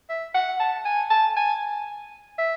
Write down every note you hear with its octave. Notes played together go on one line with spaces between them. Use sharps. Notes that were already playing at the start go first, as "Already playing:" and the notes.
E5
F#5
A5
G#5
A5
G#5
E5